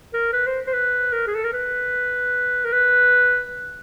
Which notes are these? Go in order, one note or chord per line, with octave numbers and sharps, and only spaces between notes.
A#4
B4
C5
C5
B4
A#4
G#4
A4
A#4
B4
A#4
B4